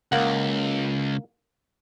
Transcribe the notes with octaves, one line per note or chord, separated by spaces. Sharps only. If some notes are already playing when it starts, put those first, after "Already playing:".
C#2 A#3 F#5